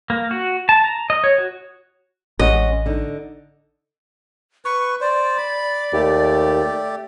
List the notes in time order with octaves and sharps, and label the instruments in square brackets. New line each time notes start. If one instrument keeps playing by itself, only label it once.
[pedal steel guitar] A#3
F#4
A5
A#5
D#5
C#5
F#4
[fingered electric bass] A1 [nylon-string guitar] G#3 C#4 F#5 [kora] D#5
[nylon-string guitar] D3 D#4
[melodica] B4 [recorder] C#6
[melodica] C5 [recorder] D5
[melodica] B5
[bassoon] D#2 [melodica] A3 G4